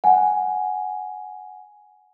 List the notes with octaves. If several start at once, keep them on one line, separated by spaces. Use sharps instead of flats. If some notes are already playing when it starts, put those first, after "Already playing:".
F#5 G#5